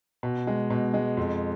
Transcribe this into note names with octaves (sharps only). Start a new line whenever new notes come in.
B2
G#3
B2
G#3
F2